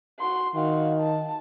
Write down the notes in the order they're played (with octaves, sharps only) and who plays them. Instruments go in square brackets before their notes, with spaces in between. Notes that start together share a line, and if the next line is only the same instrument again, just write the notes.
[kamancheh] F#4 C6
[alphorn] D#3 [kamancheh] F#4 F5
[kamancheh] A5